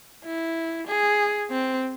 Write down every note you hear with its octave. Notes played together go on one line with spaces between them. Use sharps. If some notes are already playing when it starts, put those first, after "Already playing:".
E4
G#4
C4